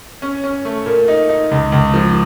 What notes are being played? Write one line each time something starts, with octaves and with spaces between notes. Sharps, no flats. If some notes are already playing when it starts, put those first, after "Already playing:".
C#4
C#4
A3
A#2
D#4
D#4
C#2
C#2
F3